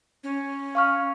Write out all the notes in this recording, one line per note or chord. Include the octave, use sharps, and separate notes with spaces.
C#4
F5 C#6 F6